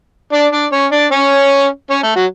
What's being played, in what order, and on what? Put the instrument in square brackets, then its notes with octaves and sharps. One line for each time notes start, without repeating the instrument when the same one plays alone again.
[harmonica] D4 D5
D4 D5
C#4 C#5
D4 D5
C#4 C#5
C#4 C#5
A3 A4
F#3 F#4